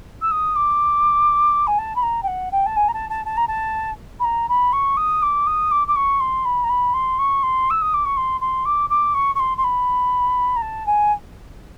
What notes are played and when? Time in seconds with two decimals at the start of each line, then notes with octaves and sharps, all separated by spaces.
0.22 E6
0.31 D#6
0.56 D6
1.67 G#5
1.78 A5
1.96 B5
2.03 A#5
2.23 G5
2.27 F#5
2.52 G5
2.66 A5
2.76 G#5
2.88 A#5
2.94 A5
3.10 A5
3.25 A5
3.37 A#5
3.48 A5
4.20 B5
4.24 A#5
4.49 B5
4.73 C#6
4.97 D#6
5.22 D6
5.47 D#6
5.71 D6
5.88 D6
5.96 C#6
6.20 C6
6.45 B5
6.64 A#5
6.69 B5
6.94 C6
7.19 C#6
7.43 C6
7.70 E6
7.82 D#6
7.94 D6
8.05 C#6
8.17 C6
8.41 C6
8.65 D6
8.90 D6
9.14 C#6
9.35 C#6
9.40 C6
9.57 C6
9.64 B5
10.56 A#5
10.62 A5
10.86 G#5